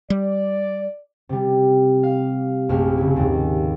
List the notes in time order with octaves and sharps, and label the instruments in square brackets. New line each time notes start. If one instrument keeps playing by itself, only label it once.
[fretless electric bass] G3 [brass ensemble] D5
[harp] C3 G3
F5
A#1 F#2 C3 A3 F6
C#3 E4
D#2 G#2